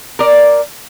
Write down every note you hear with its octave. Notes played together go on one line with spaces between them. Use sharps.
A#4 D5